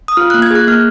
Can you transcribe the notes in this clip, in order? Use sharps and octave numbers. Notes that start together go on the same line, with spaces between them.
D#6
F4 F6
F#6
A#3
G#6
G#4 F#6
A#3 F6